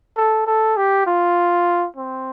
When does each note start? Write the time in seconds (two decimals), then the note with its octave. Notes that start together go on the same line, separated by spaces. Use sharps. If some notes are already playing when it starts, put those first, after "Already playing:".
0.17 A4
0.47 A4
0.77 G4
1.07 F4
1.97 C4